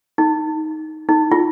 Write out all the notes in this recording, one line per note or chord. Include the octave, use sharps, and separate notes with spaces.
D#4
D#4
F4